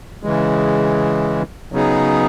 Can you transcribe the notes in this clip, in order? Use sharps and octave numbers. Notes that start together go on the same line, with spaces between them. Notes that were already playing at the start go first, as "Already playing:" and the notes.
C#3 E3 G#3
C#3 F#3 B3 D#4 G#4